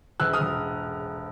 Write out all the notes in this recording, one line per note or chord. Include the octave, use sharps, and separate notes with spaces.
E1 E6 F#6
D#6 F6
E1